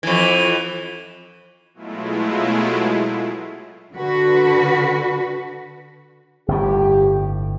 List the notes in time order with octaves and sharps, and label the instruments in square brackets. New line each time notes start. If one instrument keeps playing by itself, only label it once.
[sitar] F2 E3
[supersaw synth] B2 F#3 G#3 A3 E4 F4
[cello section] D3 F#4 B4
[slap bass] G1 A2 [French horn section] G4